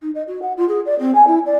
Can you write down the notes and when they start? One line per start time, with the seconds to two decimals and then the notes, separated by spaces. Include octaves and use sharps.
0.02 D#4
0.15 D#5
0.27 F#4
0.42 F#5
0.57 F4
0.69 G#4
0.86 D5
0.99 C4
1.15 G#5
1.27 E4
1.46 D5